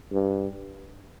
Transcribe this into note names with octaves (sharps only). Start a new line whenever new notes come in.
G2